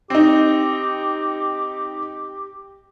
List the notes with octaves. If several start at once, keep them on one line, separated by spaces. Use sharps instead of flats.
C4 D#4 G4